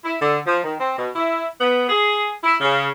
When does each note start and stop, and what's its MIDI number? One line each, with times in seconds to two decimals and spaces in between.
0.04 0.14 64
0.21 0.38 50
0.46 0.60 53
0.63 0.74 51
0.78 0.93 60
0.97 1.10 47
1.16 1.45 64
1.60 1.88 59
1.89 2.31 68
2.43 2.55 64
2.61 2.88 49